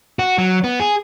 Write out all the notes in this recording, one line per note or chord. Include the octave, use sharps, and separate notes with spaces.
F#4
F#3
B3
G#4